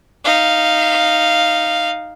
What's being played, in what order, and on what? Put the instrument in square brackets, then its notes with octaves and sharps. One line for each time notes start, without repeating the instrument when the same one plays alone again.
[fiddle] D#4 F5